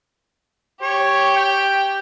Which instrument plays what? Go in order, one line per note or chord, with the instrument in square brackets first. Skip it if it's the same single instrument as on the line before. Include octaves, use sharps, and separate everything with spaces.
[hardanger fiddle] G4 [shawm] C#5
[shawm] G5